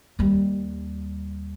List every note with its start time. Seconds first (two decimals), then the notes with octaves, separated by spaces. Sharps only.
0.19 D#2 G3